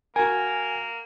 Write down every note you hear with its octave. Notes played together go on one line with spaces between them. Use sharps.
A#3 F#4 A#4 G#5